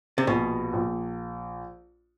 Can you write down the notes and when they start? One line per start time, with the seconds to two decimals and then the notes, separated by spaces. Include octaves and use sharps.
0.18 C3
0.27 A#1 B2
0.73 A#1